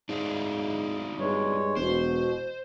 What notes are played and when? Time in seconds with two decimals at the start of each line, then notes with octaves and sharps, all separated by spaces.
0.09 G#2 D4 D#4 F4
1.19 G2 G#3 C#5
1.76 E1 B2 C5